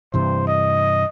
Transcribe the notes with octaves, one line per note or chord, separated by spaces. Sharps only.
G2 C3 E3 C5
D#5